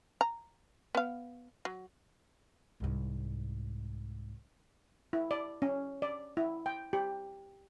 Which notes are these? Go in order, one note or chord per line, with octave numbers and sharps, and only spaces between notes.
A#5
B3 F5
F#3
C2 G#2
E4
D5
C#4
D5
E4
G5
G4